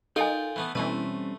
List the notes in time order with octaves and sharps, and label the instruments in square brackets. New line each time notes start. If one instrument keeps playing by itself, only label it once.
[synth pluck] D#4 [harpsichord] F4 A#4 D5 [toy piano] A4 G#5 [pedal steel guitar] G5
[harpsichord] E3 A3 B3
[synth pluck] B2 E3 [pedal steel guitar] G3 C4 C#4 [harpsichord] A3 B4